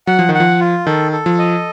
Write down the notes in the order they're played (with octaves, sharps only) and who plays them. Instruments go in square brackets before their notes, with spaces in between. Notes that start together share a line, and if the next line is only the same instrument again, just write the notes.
[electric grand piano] F#3 [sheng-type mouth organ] F#5
[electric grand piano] F3
D#3
[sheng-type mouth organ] F#5
[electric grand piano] F3
[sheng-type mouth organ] F4
[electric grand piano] D#3 [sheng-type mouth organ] A4
[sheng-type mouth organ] A4
[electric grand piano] F3
[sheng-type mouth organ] D#5